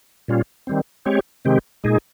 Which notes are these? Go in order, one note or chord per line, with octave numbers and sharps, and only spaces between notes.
A#2 G3 C#4 F4
D#3 G3 C4
G#3 C4 G4 C#5
C3 D#3 G#3 C4 G4
A#2 G#3 D#4 G#4